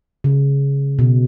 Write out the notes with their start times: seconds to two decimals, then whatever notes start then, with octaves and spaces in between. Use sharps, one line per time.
0.24 C#3
0.99 B2